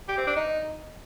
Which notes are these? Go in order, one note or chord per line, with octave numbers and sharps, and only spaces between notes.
G4
C4
D4
D#4